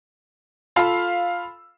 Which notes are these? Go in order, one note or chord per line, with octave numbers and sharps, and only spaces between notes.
F4 A4 F5 B5 E6